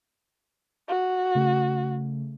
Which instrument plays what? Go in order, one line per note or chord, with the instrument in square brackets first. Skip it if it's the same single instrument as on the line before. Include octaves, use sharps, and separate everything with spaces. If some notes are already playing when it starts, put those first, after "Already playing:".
[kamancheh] F#4
[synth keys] C#3 A3